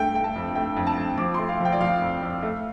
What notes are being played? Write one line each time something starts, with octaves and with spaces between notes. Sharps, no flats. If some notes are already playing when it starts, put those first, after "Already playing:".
Already playing: G2 A3 G5
A3 G5
A5
F2
A3 G5
F2
A5
F2
F3 D6
A3 C6
F5
F3 G5
D5
F3 F5
F2
F2
A3